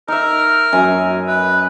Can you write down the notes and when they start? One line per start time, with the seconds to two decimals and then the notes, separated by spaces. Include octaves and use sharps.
0.08 D#4 A#4 E5
0.73 F#2 G#5
1.27 B4